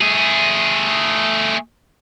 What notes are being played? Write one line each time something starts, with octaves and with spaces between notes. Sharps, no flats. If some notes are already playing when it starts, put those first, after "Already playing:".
A3 G#4